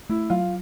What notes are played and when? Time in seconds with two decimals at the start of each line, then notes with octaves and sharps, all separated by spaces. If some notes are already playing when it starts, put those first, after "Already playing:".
0.09 A3 E4
0.30 F#3 F4